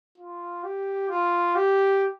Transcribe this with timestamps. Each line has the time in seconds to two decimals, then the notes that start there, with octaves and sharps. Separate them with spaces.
0.18 F4
0.63 G4
1.09 F4
1.55 G4